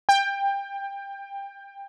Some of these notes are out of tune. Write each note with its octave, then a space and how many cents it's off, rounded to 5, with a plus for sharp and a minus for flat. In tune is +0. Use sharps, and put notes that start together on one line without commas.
G5 +20